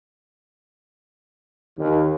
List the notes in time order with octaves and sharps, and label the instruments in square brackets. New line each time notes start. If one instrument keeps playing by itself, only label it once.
[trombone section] D#2